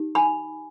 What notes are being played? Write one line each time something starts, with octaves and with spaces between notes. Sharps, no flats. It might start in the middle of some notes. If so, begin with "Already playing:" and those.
Already playing: D#4 G4
G#5 B5